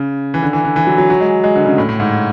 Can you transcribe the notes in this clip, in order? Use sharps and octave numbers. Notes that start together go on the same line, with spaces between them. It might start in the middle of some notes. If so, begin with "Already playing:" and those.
Already playing: C#3
E3
D3
E3
D3
E3
F#3
F#3
F#3
G#3
G#3
D3
C#3
A2
A2
G#2